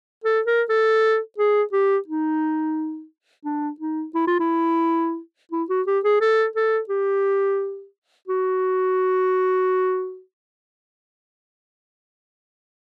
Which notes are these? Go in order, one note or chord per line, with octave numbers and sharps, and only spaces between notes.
A4
A#4
A4
G#4
G4
D#4
D4
D#4
E4
F4
E4
E4
F#4
G4
G#4
A4
A4
G4
F#4